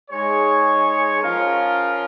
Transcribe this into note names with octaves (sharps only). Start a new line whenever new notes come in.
G#3 D#4 G#4 C#5
F3 C#4 F4 A#4